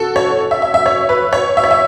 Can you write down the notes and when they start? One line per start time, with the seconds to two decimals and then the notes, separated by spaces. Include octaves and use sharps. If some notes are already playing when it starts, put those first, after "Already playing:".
Already playing: F#4 A4
0.16 C#5
0.51 E5
0.62 E5
0.74 E5
0.86 C#5
1.09 B4
1.33 C#5
1.57 E5
1.64 C#5
1.71 E5